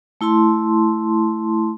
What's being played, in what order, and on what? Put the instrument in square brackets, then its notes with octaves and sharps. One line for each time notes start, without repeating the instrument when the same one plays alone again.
[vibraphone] A3 E4 A5 C6